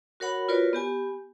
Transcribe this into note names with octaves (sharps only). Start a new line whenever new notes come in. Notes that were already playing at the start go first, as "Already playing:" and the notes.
F#4 A#4 C#5 F#5 B5
F4 F#4 A#4 B4 C#5 D5
B3 G4 G#5